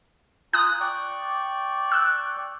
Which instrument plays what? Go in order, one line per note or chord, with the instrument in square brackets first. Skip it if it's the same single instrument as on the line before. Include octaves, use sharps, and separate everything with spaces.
[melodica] F4 G#5 A#5 [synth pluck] D#6 F#6
[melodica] D5 G5 C#6
[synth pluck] E6 F#6